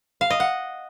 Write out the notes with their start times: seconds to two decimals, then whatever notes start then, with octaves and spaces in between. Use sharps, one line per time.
0.21 F5
0.30 D#5
0.40 F#5